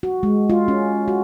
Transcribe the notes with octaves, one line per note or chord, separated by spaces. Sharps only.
F#4
G#3
F4
C#4
F#4